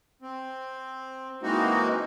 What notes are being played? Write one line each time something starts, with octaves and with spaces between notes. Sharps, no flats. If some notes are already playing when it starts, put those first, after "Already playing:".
C4
E3 G#3 A#3 C4 D#4 F#4